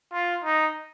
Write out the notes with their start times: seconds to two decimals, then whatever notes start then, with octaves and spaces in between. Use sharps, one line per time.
0.13 F4
0.44 D#4